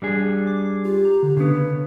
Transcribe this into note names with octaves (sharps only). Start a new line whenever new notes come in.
G3 D4 G#4
D6
F4 G4
A#5
D3
C#3 B3 D4